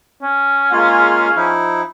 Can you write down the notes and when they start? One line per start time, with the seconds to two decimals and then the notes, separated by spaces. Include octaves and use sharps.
0.22 C#4
0.72 G#3 A#3 F4 G#4 F5
1.36 F3 D#4 E4